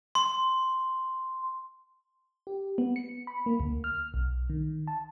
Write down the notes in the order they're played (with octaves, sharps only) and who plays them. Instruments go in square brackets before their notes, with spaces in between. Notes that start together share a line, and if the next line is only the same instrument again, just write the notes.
[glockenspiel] C6
[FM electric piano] G4
B3
C#7
B5
A#3
D2
F6
B1
D#3
A5